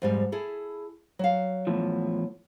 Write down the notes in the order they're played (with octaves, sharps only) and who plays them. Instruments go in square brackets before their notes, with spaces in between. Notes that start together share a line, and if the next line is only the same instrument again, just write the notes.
[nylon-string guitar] F2 G#2 G3
E4 G#4 A4
F#3 F5
[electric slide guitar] E2 A2 F3